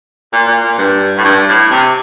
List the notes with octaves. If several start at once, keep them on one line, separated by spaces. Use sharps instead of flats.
A#2
A#2
A#2
G2
A2
G2
A2
C3